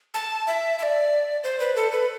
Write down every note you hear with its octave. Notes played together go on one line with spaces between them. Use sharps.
A5
E5
E5
D5
C5
B4
A4
B4